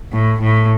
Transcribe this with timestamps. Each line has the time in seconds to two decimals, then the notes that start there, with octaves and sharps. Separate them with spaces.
0.12 A2
0.41 A2